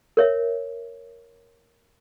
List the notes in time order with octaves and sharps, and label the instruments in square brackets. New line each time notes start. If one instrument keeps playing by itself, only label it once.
[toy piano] A#4 C#5 E5